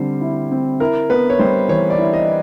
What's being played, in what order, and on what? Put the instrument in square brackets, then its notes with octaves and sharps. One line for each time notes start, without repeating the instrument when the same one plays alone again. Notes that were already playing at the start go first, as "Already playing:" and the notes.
Already playing: [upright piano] D3 G3 C4 [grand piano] C5
[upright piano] E4
C4
[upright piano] E4 [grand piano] A#4
[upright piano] B3 [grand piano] B4
[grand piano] C#5
[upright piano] G3 [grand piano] C5
[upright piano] E3 [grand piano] C#5
[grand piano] D5
[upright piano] E4
[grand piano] D#5